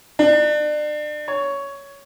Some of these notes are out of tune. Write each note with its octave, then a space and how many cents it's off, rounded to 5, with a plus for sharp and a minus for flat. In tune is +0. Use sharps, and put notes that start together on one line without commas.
D4 +35
C#5 +10